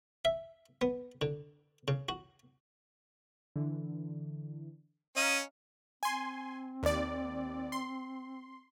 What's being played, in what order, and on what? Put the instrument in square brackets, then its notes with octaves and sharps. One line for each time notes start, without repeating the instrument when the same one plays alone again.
[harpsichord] E5
B3
D3
C#3
F#4
[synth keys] D3 E3
[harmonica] C#4 [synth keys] D#5 F5 A#5 [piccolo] D#7
[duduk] C4 [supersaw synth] G#5 C6
[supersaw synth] D#2 D5
C6